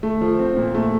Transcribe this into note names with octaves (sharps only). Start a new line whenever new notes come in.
A3
F3
C4
A#2
A3